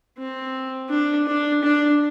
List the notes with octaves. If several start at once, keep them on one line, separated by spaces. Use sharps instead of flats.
C4
D4
D4
D4